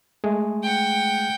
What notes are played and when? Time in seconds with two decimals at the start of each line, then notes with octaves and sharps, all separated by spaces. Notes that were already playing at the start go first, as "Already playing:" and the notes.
0.24 G#3 A3 G#4
0.64 F#5 G5